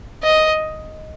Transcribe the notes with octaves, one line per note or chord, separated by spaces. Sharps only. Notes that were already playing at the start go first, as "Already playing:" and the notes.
D#5